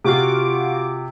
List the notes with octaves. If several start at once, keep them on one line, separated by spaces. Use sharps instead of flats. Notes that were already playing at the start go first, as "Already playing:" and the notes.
C3 F4 F#4 D6